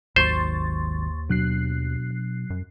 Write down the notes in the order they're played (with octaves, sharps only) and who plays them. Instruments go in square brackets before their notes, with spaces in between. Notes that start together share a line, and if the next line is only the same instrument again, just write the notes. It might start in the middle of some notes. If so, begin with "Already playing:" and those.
[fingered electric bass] G#1 D#3 F#3 [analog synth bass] D#2 [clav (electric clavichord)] C5 [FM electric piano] C6 C#6 A6
[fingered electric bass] B2 D4 [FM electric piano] F#3 F#6 C7
[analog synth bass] F#2